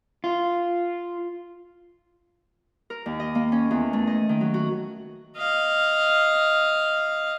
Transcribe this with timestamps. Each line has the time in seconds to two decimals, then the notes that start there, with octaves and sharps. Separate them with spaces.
0.24 F4
2.90 A#4
3.06 D#2
3.20 D#5
3.35 A#3
3.52 C#4
3.71 E2
3.93 A3
4.07 D#5
4.29 D#3
4.41 F#3
4.54 F#4
5.36 D#5 F5